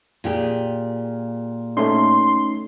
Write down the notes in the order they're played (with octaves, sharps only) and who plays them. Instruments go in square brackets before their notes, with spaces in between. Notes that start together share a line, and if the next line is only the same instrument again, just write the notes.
[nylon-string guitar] A#2 G4 G#4
[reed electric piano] A3 C#4 D#4 [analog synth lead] C6